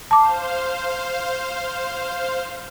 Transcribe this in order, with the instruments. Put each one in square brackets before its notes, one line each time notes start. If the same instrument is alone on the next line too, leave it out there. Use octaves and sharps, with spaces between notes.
[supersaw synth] C5 F5 [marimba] A5 D6